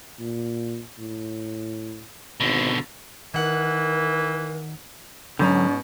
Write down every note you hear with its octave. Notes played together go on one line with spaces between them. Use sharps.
A#2
A2
G#1 B2 D3
D#3 E3 A#4 F#5
G#2 B2 D3 F#3 C#4 A#5